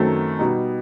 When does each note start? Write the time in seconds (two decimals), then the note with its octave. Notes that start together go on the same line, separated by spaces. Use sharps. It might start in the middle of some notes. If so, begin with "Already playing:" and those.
Already playing: F#2 D#3 F#3 A3 C4
0.39 B2 G3 D#4